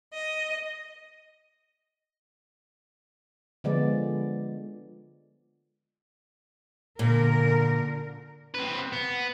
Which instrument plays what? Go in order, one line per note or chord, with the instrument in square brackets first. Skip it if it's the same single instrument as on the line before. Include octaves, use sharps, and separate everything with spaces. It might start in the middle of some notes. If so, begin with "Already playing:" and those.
[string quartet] D#5
[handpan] D3 F3 G#3 B3 D5
[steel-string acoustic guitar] A#2 [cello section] D3 A#4
[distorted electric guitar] C4 B4
B3